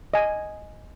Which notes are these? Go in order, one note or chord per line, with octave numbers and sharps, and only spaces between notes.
D#5 G#5